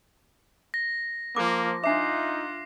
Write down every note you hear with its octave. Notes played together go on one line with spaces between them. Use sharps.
A#6
F3 A#3 D6
D4 D#4 F4 E5 F#5 D6 C7